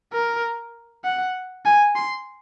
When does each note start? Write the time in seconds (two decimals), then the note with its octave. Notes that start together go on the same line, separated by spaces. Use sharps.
0.13 A#4
1.04 F#5
1.65 G#5
1.96 C6